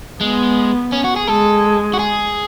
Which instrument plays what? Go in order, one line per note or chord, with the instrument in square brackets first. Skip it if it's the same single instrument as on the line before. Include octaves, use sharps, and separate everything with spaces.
[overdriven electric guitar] G#3 [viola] B3
[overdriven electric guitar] C#4
F#4
G#4
[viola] G#3 [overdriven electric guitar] A4
[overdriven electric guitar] F#4
G#4